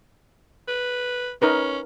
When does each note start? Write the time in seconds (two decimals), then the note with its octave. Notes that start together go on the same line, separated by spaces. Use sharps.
0.68 B4
1.42 C#4 D#4 A#4 B4